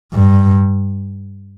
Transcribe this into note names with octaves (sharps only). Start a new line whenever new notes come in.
G2